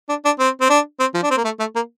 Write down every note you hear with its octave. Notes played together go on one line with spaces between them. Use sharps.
D4
D4
C4
C4
D4
C4
F3
D4
C4
A#3
A3
A3
A#3